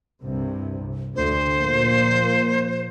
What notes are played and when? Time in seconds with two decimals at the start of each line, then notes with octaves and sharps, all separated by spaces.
0.21 C2 G2 C3
1.16 D2 C5
1.58 A#2 F3 A#3